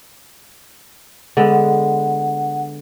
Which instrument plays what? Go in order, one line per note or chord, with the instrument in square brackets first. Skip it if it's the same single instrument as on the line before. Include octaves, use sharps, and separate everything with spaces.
[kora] D3 G#3 B3 [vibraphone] F#5